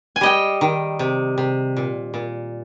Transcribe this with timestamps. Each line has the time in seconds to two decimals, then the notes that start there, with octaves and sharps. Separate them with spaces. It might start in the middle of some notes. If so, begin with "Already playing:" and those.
0.16 G#5
0.21 G3 D#5 G5
0.61 D#3
0.99 C3
1.38 C3
1.77 A#2
2.14 A#2